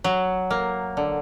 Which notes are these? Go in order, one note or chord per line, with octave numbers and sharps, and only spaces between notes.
F#3
A#3
D3